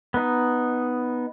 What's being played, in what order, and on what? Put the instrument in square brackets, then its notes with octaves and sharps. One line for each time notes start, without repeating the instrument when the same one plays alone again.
[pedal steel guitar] B3 D#4